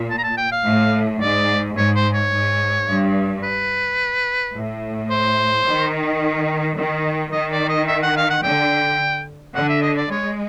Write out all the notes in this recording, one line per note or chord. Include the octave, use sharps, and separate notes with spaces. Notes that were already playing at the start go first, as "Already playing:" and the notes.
Already playing: A#2
A5
A#5
A5
G5
F5
A2
G#2 D5
G#2 C#5
C5
C#5
G#2
G2
B4
A2
C5
D#3
D#3
D#3 D#5
D5
D#5
E5
F#5
F5
F#5
D3 G5
D3 F#5
E5
D#5
D5
G#3 C#5